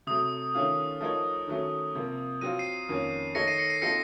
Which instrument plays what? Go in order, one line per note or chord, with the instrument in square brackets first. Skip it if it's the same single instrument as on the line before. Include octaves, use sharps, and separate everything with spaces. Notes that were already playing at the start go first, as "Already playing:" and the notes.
[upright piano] C3 F#3 A3 [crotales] D#6
[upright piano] D#3 A3 C#4 F4
F3 A3 D#4 A#4 C#5
D#3 F#3 A3 C#4
C3 F3 A#3
[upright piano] F#3 C4 F4 [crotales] D#7
[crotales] C7 D#7
[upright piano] F2 D#3 A#3 C#4
[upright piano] D#3 A3 D#4 A4 C#5 [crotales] A#6 C#7
[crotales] C7 D#7
A#6 C#7
C7 D#7
[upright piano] F3 C4 D#4 A4 [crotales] A#6 C#7